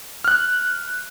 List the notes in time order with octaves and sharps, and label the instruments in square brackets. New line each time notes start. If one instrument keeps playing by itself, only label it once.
[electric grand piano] F6 F#6